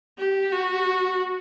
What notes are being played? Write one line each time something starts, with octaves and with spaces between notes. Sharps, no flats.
G4
F#4